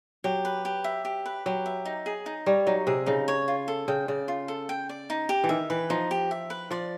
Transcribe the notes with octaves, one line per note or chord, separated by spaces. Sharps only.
F#3 G4
B4
G4
E5
G4
B4
F#3 G4
E5
D#4
G#4
D#4
G3 C#5
F#3 D#4
C3 G#4
C#3 D#4
C#5
F4
A4
C#3 G5
C#3 D5
F4
A4
G5
D5
D#4
G4
E3
D#3 E5
E3 B4
F3 D#4
G4
E5
B4
F3 D5